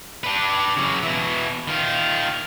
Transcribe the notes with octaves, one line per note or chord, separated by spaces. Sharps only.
D4 B4
C#3 F#3
B2 E3
D#3 F4